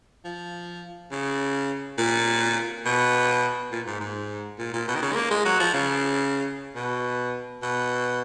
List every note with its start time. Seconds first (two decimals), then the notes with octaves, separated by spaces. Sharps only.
0.25 F3
1.11 C#3
1.98 A#2
2.86 B2
3.72 A#2
3.86 G#2
4.01 G#2
4.59 A#2
4.73 A#2
4.88 B2
4.95 D#3
5.02 C#3
5.12 G#3
5.16 A#3
5.31 G#3
5.45 F#3
5.60 F3
5.74 C#3
6.76 B2
7.63 B2